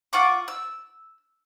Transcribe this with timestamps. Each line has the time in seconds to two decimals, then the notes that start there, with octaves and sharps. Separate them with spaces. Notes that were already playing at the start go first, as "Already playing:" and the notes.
0.13 F4 F#5 C#6 D6
0.48 E6